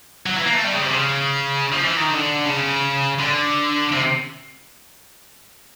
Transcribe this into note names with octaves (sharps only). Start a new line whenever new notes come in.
F#3
E3
A#3
A3
G3
C#3
C3
C#3
F3
E3
D#3
D3
C#3
D3
C3